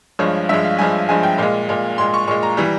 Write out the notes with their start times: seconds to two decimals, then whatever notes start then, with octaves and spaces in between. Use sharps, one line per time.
0.19 G2 F3 G#3 C#5
0.49 G2 F3 G#3 E5
0.64 F5
0.79 G2 F3 G#3 G#5
1.09 G2 F3 G#3 G#5
1.23 G5
1.38 A#2 G#3 F5
1.69 A#2 G#3
1.98 A#2 G#3 C6
2.14 C#6
2.28 A#2 G#3 C#6
2.43 A#5
2.57 E3 G3